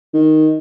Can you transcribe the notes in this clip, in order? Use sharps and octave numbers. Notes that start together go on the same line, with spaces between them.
D#3